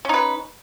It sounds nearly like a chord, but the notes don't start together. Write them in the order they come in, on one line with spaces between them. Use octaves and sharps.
C#4 D#4 B4